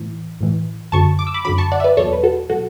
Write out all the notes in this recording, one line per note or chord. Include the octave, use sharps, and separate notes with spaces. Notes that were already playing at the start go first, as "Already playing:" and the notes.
Already playing: A2 E3
A2 E3
F#2 D3 F#3 A5 C#6
D6
E6
B5 D6
F#2 D3 F#3 B5 D6
A5 C#6
D5 F#5
E5
B4 D5
E2 B2 F#3 A4 C#5
B4
F#4 A4
B2 F#3 F#4 A4